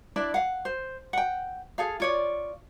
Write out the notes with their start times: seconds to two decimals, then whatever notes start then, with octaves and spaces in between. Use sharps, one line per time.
0.16 D4 E4 D5
0.34 F5 F#5
0.65 C5
1.13 F#5 G5
1.78 G#4 A4 F5
2.00 F4 C#5 D5